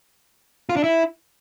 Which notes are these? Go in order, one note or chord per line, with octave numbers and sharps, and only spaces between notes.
F4
D4
E4